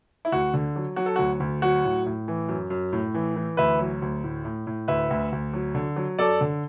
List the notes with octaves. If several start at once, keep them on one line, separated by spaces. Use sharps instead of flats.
E4
D2 F#4
D3
F#3
F#3 F#4
A4
D2 F#4
D2
F#3 F#4
A2
A2
E3
F#2
F#2
A2
E3
E3
D2 B4 E5
F#3
D2
A2
A2
A2
D2 B4 E5
D2
D2
F#3
D3
F#3
F#2 A4 D5
D3